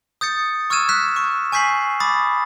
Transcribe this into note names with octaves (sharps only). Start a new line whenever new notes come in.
D#6 G6 A6 C#7
C#6 E6 F6 G#6 D#7 E7
F6 F#6 B6 E7
C#6
G#5 C#6 G6 B6 C7 F#7
B5 D6 D#6 A6